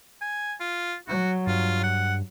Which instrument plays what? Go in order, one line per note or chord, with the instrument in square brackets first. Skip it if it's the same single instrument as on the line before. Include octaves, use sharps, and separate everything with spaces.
[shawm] G#5
F4
[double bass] F#3 [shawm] F#4
[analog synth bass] G2 [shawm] F4
[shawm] F#5